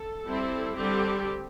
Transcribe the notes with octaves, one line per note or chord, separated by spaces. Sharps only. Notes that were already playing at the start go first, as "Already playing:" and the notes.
Already playing: A4
G3 C4 E4
D3 G3 C4 G4